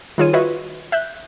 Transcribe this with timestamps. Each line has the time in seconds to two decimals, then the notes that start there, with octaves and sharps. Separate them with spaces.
0.18 D#3 G3 F4 G#4 C#5 D#7
0.33 F4 F#4 B4 C#5 D#5 E5
0.92 E5 F#6 G6